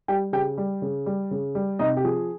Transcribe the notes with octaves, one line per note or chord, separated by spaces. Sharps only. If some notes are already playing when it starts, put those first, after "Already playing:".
G3 G4 G5
C#3 G4 G5
G3
C#3
G3
C#3
G3
C3 D#4 D#5
G4
F3 G#4